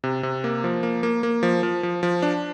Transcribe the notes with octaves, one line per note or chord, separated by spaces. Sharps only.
C3
C3
A#3
F3
A#3
A#3
A#3
F3
F3
F3
F3
D4